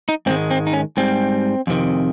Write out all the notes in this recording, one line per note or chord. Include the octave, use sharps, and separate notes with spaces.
D#4
G#2 D#3 G#3 C4
C4
D#4
C#4
G#2 G3 C4
F2 C3 D#3